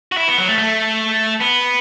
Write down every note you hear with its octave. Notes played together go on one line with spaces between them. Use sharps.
F#4
E4
B3
F#3
A3
A3
B3